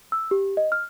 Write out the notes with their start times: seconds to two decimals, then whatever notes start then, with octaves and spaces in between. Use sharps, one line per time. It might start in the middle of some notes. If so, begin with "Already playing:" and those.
0.12 E6
0.31 G4
0.57 D#5
0.72 F6